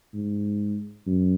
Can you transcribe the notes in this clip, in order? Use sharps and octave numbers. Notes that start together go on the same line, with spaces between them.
G#2
F#2